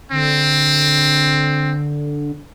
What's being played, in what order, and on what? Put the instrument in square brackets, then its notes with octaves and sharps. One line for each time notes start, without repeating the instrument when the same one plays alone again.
[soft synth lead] D3 [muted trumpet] C4